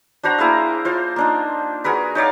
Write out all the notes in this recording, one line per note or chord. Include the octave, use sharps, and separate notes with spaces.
D4 F#4 C5 A#5
A#3 E4 G#4 F5
F4 C5
A#3 D4 D#4
F#4 G#4 A#4 B4
D#4 C#5 D5 F5